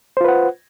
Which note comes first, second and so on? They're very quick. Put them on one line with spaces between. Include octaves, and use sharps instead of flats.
C5 F4 B4 F#5